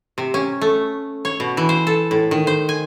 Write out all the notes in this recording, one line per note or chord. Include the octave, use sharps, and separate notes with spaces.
C3
C#4
A3
C#5
B2
E3
C5
A4
A2
D#3
C5
G#5